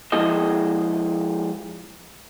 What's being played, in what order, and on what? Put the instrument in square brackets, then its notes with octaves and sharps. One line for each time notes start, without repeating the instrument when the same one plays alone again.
[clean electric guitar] F3 G#3 E4 G#4 C5 D#5